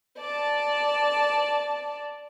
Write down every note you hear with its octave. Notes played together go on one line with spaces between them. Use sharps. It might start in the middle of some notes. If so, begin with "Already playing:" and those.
D5 A5